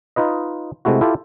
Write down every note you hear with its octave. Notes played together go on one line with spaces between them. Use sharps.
D#4 F4 B4 D#5
C3 G#3 A3 E4 F#4
E4 F4 G4 A4